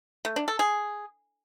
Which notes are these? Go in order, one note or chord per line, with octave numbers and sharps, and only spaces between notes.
A3
D4
A4
G#4